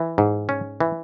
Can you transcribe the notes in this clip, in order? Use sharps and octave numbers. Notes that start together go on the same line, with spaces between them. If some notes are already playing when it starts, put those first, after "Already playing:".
Already playing: E3
G#2
C#4
E3